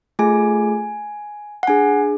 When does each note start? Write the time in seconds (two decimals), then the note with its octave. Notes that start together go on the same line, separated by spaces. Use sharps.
0.19 A3 F4 G#4 G#5
1.63 F#5
1.67 D4 G#4 G#5